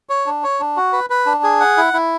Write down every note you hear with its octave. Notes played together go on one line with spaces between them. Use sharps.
C#5
D4
C#5
D4
F#4
B4
B4
D4
G#4
F#5
E4
E4